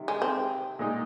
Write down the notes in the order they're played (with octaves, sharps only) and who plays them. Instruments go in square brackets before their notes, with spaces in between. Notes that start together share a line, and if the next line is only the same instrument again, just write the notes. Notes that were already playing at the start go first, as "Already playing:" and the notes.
Already playing: [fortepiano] C3 D#3 G3
[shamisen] G#3
C4
[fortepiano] A#2 G#3 D#4